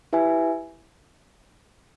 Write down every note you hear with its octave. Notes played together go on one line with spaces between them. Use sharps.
E4 G4 B4 E5 G#5